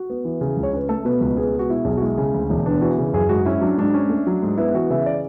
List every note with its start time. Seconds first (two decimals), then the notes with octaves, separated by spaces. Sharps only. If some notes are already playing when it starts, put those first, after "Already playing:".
Already playing: F#4
0.10 B3
0.25 E3
0.41 C#3
0.57 C#2
0.63 C#5
0.73 C#4 B4
0.89 A3 A4
1.05 B2 B4
1.21 C#2 B4
1.37 B3 G#4
1.53 G#3
1.59 F#4
1.69 B2 E4
1.85 B1 G#4
1.97 F#4
2.02 G#3 E4
2.17 C#3
2.34 D2
2.50 E1
2.66 B3 D4
2.81 E3 F#4
2.98 C#3
3.13 F#2 G#4
3.29 G#2 F#4
3.45 C#4 E4
3.61 F#3 D4
3.78 G#2 D4
3.94 C#4
4.09 A3
4.27 F#3
4.43 G#2
4.58 B3 E4
4.74 E3 F#4
4.90 C#3 E5
5.06 D5